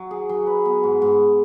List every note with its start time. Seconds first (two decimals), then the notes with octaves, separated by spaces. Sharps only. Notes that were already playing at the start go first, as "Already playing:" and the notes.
Already playing: F#3
0.11 G#4
0.29 F#3
0.47 B4
0.65 B3
0.83 G#2
1.02 G#2